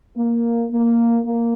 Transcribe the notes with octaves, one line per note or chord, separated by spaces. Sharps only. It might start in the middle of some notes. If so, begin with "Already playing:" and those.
A#3
A#3
A#3